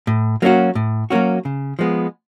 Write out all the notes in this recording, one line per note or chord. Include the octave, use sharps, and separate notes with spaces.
A2
F#3 A#3 C#4 F#4
A2
F#3 A#3 C#4 F#4
C#3
F3 G#3 B3